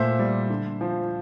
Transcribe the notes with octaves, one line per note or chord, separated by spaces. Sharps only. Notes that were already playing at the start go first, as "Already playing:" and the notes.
Already playing: A#2 A3 C5 E5
G3
D3
F3